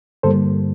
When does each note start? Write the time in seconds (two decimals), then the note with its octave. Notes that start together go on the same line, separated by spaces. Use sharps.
0.23 G2 D3 G3 A#3 A4 C5